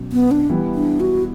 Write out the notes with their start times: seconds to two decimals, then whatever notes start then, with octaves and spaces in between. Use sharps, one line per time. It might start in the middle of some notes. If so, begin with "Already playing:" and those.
Already playing: B2 F#3 C#4
0.12 B3
0.31 D4
0.49 E3 G3 B3 E4
0.75 D4
1.00 F#4